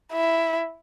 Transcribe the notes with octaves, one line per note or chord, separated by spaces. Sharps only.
E4